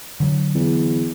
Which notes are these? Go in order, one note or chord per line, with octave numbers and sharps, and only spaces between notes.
D3 F#3
E2